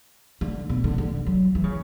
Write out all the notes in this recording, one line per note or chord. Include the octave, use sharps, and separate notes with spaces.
D3
B2
D3
D3
F#3
E3
C#3